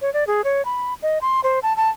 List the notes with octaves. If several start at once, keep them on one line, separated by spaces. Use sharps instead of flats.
C#5
D5
G#4
C#5
B5
D#5
C6
C5
A5
A5